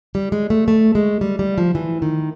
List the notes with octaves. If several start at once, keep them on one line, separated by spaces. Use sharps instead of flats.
G3
G#3
A3
A3
G#3
G3
G3
F3
E3
D#3